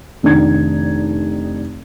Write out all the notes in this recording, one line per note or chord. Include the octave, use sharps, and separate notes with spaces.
F1 D#3 D4 D#4 G#6